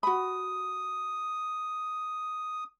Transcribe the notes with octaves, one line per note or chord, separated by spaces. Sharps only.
F#4 B5 D#6